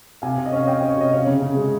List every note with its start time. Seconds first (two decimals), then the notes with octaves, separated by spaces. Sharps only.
0.22 C3 F5 G#5
0.38 C3
0.46 D#5
0.52 C#4 C#5 F5
0.67 C#4 D#5 G5
0.78 C#4 D#5
0.90 C#5
0.97 C3 D#5
1.13 C#4 C#5 F5
1.27 C#3
1.42 C#3
1.57 G#3